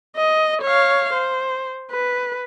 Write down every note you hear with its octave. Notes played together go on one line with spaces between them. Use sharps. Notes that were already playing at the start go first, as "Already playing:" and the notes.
D#5
C#5 F5
C5
B4